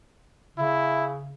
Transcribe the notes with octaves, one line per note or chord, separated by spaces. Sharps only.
C#3 E4